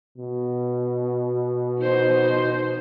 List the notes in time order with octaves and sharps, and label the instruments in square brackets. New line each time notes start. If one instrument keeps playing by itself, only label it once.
[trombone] B2
[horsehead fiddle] D#4 C5